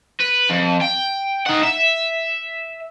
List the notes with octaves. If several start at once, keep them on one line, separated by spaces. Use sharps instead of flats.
B4
F2
G5
D#4 F#5
E5